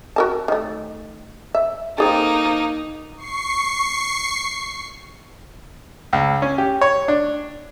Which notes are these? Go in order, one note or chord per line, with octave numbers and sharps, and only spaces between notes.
F#4 A#4 A5
D#3 A3
E5
A#3 C4 D#4 G#4 A4
F3
C#6 C7
C#2
C#4
G4
C#5
D4